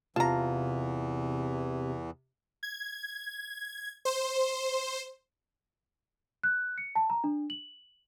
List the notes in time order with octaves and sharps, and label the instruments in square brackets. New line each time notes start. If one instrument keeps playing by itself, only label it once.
[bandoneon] E2 E3 [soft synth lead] C3 [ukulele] F4 [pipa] A5 A#5
[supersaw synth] G#6
C5
[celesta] F#6
C#7
A5
A#5
D4
F#7